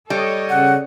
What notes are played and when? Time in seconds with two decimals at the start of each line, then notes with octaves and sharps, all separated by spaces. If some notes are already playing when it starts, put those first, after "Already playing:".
0.10 G3 A4 C#5 D#5
0.49 C#3 F#5